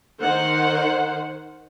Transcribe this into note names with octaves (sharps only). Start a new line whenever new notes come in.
D#3 C5 F#5